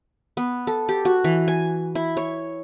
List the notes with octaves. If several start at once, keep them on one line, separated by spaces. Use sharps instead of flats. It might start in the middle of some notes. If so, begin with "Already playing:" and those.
B3
A4
G4
F#4
E3
G#5
E4
C#5